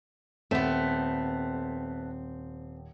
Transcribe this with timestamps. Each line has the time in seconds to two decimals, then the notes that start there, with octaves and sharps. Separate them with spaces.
0.51 D#1 A3 B3 C4